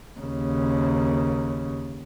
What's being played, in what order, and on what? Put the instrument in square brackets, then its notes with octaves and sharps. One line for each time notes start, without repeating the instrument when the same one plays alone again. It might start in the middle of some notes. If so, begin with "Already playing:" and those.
[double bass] D#2 C#3